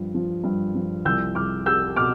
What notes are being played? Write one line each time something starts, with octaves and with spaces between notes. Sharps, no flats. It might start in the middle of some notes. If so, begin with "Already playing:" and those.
Already playing: G2 F3
F3
G2
F3
C2 E6 G6
C2 D6 F6
G3 E6 G6
B2 D6 F6